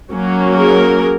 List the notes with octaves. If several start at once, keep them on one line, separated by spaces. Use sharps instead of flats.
F#3 A#3 C#4
G#4 A#4